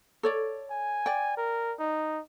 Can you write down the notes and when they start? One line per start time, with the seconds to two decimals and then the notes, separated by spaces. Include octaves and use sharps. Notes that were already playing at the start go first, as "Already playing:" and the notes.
0.23 A4 C#5 D5
0.71 G#5
1.06 D5 G5
1.38 A#4
1.80 D#4